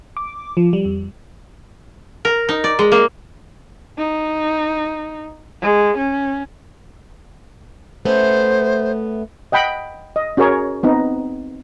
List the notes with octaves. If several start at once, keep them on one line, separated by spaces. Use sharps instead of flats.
D6
F3
G3
F2
A#4
D#4
D5
G#3
A#3
D#4
G#3
C#4
A3 B3 C#4 C5
D#5 F#5 G5 B5
D#5
C#4 F#4 G#4 A#4 C#5
B3 C4 D#4